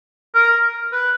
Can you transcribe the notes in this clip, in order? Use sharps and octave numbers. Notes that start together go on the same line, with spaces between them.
A#4
B4